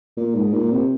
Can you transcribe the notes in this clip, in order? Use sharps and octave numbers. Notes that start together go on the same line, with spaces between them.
A#2
G#2
A#2
C3